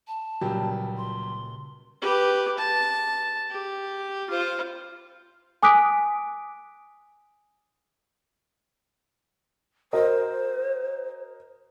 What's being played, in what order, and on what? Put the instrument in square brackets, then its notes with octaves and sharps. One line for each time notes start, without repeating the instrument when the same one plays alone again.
[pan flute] A5
[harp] C#2 A#2 [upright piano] F#3 G3 G4
[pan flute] C6
[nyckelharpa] G4 B4
A5
G4
F4 C5
[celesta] G#5 D6 D#6 F#6 B6 D7
[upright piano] F#4 A#4 D#5 [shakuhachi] C5